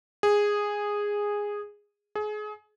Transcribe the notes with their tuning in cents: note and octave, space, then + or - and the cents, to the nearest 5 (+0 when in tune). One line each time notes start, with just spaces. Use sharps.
G#4 -10
G#4 +30